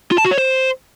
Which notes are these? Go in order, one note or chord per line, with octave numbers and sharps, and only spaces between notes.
F4
A5
F#4
C#5
C5